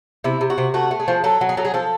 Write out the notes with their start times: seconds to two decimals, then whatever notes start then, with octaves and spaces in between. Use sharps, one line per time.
0.24 C3 E4
0.41 C3
0.50 F#4
0.58 C3
0.74 A3 F#4
0.91 A3
1.00 G#4
1.08 F3
1.24 F#3 A4
1.41 F#3
1.49 G#4
1.57 F#3 A4
1.65 G#4
1.74 F3 A4